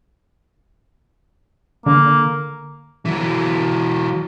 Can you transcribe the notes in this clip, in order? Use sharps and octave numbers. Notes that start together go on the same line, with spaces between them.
D3 A#3
E3 F#3